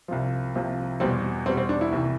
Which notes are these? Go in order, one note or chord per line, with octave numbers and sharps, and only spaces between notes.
C2 C3 F3
C2 C3 F3
E2 B2 G3 C4
E2 B2 G3 C4
C4
D4
E4
C2 C3 E3